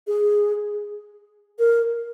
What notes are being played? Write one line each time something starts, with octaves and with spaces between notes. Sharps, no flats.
G#4
A#4